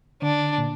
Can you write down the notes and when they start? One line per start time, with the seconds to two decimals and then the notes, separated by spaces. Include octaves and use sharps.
0.22 D3 D4
0.58 A#2